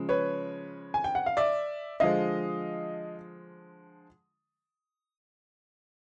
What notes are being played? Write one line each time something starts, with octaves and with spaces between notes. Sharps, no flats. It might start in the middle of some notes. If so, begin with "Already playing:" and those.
Already playing: C#3 F3 G#3
B4 C#5
G#5
G5
F#5
F5
D5 E5
D3 F3 G#3 D#5 F5